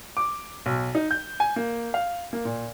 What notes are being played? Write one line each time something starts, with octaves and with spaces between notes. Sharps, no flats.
D6
B1
D#4
G6
G#5
A#3
F5
A#3
A#2